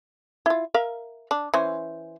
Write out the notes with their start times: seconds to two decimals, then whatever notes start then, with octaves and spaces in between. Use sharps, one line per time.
0.46 E4 F4
0.74 A#4 E5 F5
1.31 D4
1.54 E3 C#4 C5